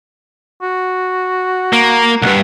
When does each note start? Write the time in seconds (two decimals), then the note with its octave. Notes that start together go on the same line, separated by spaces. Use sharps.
0.62 F#4
1.73 A#3
2.22 C2 G2 F#5